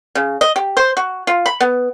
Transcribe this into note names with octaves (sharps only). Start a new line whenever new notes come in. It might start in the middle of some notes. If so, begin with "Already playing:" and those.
C#3
D#5
G4
C5
F#4
F4
B5
B3